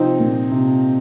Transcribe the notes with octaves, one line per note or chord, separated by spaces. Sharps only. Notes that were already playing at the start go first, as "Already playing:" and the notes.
Already playing: C3 F3 C4 D#4
A#2
C3